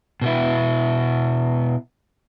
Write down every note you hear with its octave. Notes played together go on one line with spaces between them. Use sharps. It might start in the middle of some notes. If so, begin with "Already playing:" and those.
B2 B3 E4